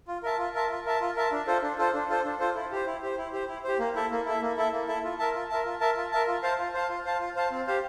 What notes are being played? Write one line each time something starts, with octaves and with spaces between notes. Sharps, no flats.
F4
A#4 E5 A5
F4
A#4 E5 A5
F4
A#4 E5 A5
F4
A#4 E5 A5
D4
F4 A4 C5
D4
F4 A4 C5
D4
F4 A4 C5
D4
F4 A4 C5
E4
G4 C5
E4
G4 C5
E4
G4 C5
E4
G4 C5
A#3
E4 A4 E5
A#3
E4 A4 E5
A#3
E4 A4 E5
A#3
E4 A4 E5
F4
A#4 E5 A5
F4
A#4 E5 A5
F4
A#4 E5 A5
F4
A#4 E5 A5
F4
C5 F5 A5
F4
C5 F5 A5
F4
C5 F5 A5
F4
C5 F5 A5
C4
G4 C5 F5